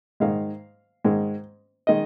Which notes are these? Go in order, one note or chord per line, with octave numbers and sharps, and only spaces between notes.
G#2 D#3 G#3 F5
G#2 D#3 G#3
D#3 G#3 D#5